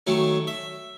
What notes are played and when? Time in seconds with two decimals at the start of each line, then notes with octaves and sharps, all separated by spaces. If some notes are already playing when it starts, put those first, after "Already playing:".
0.07 D#3 F#3 A3 C#4
0.47 E5